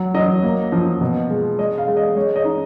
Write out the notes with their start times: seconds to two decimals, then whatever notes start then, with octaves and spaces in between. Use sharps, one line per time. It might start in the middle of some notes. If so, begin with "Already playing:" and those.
Already playing: F#3
0.15 F#3 D#5
0.43 A#3
0.72 F3
1.01 B2
1.30 G#3
1.58 G#3 D#5
1.78 F5
1.88 G#3
1.97 D#5
2.16 G#3 C#5
2.36 D#5
2.45 D#4